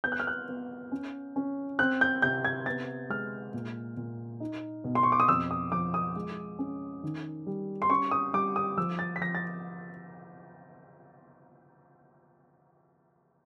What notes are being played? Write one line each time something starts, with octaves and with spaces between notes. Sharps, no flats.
B3 G6
F#6
F6
F#6
B3
C#4
C#4
C4 F#6
G6
C3 G6
G#6
B3 A6
G#3 F6
A#2
A#2
D#4
B2
C6
C#6
D6
D#6
F2 E6
D#6
F3 D6
D#6
G#3
C#4
D#3
G3
C6
C#4 C#6
D#6
G3 D6
D#6
F3 E6
A6
B6
F3 A#6
A6